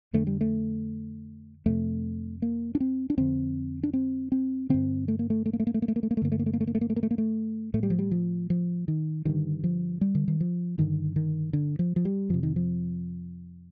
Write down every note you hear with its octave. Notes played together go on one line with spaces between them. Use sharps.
F2 D3 A3
G3
A3
F2 C3 A3
A#3
D4
C4
D4
F2 D3 C4
D4
C4
C4
G2 D3 C4
A3
A#3
A3
A3
A#3
A3
A#3
A3
A#3
A3
A#3
A3
A#3
A3
G2 D3 A#3
A3
A#3
A3
A#3
A3
A#3
A3
A#3
A3
A#3
A3
A#3
A3
A2 A3
G3
F3
G3
F3
F3
D#3
G2 D3 D#3
F3
G3
D3
D#3
F3
G2 D3 D#3
D#3
D3
F3
F3
G3
F2 C3 F3
D#3
F3